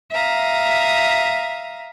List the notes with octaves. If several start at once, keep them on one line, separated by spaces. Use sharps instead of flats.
E5 F5 A#5 D#6